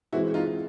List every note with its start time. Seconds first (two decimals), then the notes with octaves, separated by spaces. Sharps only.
0.13 E3 G#3 C4 E4 F#4
0.34 D#4 F4